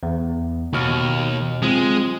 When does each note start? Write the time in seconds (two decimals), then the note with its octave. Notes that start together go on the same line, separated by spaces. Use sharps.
0.03 E2
0.73 D#2 B2 F6
1.62 G#3 C4 F4